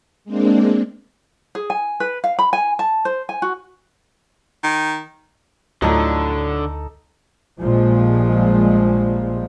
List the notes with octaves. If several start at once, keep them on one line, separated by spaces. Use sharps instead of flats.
G#3 A#3 C4 D4
G#4
G#5
B4
F5
B5
G#5
A5
C5
G#5
F#4
D#3
D2 A2 D3 F3 F#3 D#4 A4
A#1 A#2 F3 G3 G#3